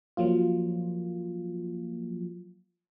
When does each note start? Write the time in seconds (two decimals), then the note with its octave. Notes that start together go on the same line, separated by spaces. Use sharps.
0.17 F3 F#3 A#3 F4